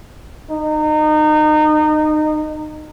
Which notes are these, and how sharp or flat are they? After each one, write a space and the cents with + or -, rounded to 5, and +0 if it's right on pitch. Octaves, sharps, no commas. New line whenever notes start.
D#4 -25